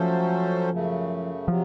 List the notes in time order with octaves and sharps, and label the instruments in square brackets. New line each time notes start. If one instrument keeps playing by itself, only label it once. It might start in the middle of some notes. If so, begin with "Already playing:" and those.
Already playing: [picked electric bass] F3 [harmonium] F#3 A3 C#4 A4 C5
[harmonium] F#2 C#3 A3
[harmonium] C3 F#3 [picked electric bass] F3